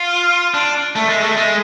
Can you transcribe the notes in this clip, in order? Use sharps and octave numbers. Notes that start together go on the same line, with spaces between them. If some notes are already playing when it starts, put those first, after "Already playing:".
Already playing: F4
D4
A3
G#3
A3
G#3